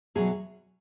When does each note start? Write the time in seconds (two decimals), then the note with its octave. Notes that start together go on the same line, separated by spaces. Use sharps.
0.15 E2 B2 F#3 G#4